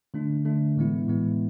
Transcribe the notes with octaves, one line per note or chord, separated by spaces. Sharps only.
D3 A3 D4
D3 A3 D4
A2 E3 G#3 B3 E4
A2 E3 G#3 B3 E4